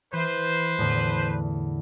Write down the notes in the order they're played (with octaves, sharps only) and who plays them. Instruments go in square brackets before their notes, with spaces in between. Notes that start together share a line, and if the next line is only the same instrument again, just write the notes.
[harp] E3 E5 [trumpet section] B4 C5
[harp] E2 A2 D3